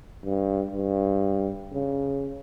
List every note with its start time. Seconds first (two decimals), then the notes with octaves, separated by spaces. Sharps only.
0.24 G2
0.71 G2
1.73 C#3